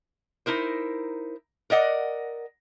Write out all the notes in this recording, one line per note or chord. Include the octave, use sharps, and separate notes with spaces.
D#4 E4 A#4 C5
A#4 D5 D#5 F#5